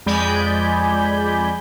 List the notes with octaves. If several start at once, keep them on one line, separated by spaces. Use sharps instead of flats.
F2 G#3 D5 G#5 B5 G6